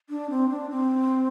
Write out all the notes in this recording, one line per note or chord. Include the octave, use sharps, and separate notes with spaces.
D4
C4
D4
C4